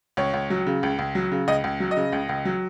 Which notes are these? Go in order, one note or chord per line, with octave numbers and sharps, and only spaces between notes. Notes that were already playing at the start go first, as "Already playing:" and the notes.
C#2 C#5
C#2
F#3
C#3
C#2
C#2
F#3
C#3
C#2 D#5
C#2
F#3
D#5
C#3
C#2
C#2
F#3